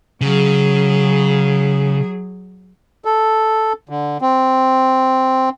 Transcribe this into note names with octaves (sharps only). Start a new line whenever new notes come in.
C#3 F#3 G#4
A4
D3
C4